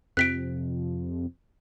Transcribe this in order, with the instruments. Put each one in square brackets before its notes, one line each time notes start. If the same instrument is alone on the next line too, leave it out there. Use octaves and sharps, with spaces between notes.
[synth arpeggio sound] F2 C3 [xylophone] F#6 B6 D7